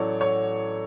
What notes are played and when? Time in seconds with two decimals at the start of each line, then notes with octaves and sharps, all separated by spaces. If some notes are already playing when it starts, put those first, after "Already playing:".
Already playing: A1 A2 F#3 A4 C#5 D5
0.21 C#5